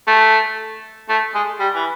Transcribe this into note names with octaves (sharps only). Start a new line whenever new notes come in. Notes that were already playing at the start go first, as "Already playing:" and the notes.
A3
A3
G#3
G3
E3